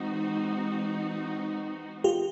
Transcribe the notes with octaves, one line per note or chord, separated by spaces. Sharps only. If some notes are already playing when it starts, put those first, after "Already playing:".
Already playing: E3 G#3 C4 D#4 F#4
F4 G4